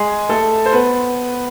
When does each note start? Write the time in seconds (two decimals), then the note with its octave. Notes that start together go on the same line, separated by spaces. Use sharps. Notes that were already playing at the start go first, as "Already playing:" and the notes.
Already playing: G#3 G#4
0.29 A3 A4
0.66 C5
0.72 B3 B4